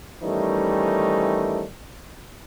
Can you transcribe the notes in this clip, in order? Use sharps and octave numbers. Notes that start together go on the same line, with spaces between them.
D#3 E3 G3 A3 C#4 D#4